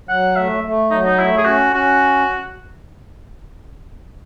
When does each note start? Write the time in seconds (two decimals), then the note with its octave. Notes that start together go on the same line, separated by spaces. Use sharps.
0.09 F#3 F#5
0.36 A3 E5
0.64 A3
0.91 F#3 D#4
1.05 D#4
1.18 A3 E4
1.37 G#4
1.45 C#4 F#4
1.73 C#4 F#4